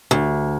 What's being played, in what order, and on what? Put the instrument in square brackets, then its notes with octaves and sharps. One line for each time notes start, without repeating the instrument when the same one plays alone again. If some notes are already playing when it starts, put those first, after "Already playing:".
[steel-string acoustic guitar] D2